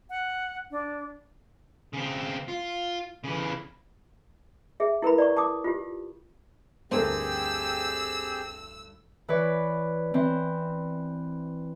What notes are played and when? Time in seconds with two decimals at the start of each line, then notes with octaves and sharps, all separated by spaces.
0.10 F#5
0.71 D4
1.93 C#3 C4
2.48 F4
3.24 C#3 E3
4.80 G#4 E5
5.02 E4 A#4 B4 B5
5.18 D5 A#5 C#6
5.37 A5 D6 D#6
5.64 F4 G4
6.91 D2 G2 C4 G4 G#4 A#4 C5 E6
9.28 E3 B4 C#5 D5
10.14 E3 C4